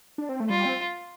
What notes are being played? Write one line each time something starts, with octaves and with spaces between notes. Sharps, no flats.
D4
C4
A3
G3 F4
C4